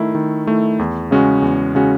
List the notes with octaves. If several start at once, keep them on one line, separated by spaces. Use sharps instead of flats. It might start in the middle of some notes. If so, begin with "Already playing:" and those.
Already playing: D#3 A3 E4
D#3
A3 E4
E2
C#3 G#3 C#4 F#4
E2
C#3 G#3 C#4 F#4